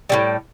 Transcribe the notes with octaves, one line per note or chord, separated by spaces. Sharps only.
A2 E3 G3